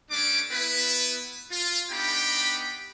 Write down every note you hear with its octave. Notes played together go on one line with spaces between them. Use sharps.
G3 A3 C#4 D4 D6
B3 E4 B4
F4
B3 D4 D#4 G4 G5 B5